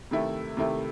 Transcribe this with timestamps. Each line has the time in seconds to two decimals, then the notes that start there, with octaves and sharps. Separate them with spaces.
0.11 C3 D#3 A3 E4
0.57 C3 D#3 A3 E4